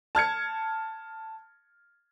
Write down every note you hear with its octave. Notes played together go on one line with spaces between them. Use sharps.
A5 F6 G#6 C#7